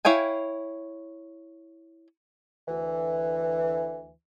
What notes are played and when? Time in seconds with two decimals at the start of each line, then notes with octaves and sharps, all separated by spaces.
0.05 E4 C#5 F5 G5 G#5
2.68 D2 E3